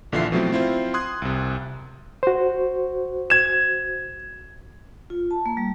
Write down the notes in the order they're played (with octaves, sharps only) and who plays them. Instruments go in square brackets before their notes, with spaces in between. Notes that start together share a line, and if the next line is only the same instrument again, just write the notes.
[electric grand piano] A#1 D3 E3 F4 E5 C7
B2 F3 F#3 A3 C4 E4
C4 E4 F4 C5
C6 D#6 F#6 G#6
C2 C3
[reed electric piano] F#4 C5
[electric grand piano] G#6 E7
[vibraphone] F4
A5
A#3
G3